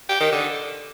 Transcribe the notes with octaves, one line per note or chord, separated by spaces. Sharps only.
G4
D#3
D3